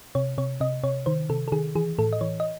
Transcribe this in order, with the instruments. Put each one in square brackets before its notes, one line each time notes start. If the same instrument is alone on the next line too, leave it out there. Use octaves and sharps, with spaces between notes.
[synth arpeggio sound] C3 C#5
C3 C#5
C3 D#5
C3 C#5
D#3 C5
C3 A4
A4
D#3 G#4
E3 G#4
A2 A4
D#5
E3 C#5
D#5